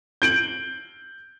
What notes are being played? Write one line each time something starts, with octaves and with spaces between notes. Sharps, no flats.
G6 D7 F#7